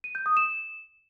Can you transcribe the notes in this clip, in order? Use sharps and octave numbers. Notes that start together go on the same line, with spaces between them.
D#7
G6
D#6
E7